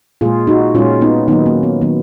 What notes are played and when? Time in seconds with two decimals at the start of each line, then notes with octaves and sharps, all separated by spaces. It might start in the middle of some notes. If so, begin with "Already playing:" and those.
0.21 A#2 G#3 F4 G#4
0.47 D#4 F#4
0.75 A#2 G#3 C#4 F4
1.01 B3 D#4
1.28 D#3 F#3 A#3 B3 D#4
1.46 A#3 C#4
1.63 B3
1.81 D#3 F#3 A#3 B3